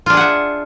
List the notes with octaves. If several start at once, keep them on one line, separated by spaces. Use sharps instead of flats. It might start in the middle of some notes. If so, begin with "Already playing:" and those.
D4 F4 G#4 E5 F#5